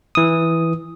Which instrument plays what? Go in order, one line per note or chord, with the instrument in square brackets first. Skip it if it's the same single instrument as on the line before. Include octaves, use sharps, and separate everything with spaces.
[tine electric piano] E3 D#6